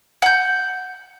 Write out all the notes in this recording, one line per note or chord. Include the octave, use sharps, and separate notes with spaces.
F#5 G6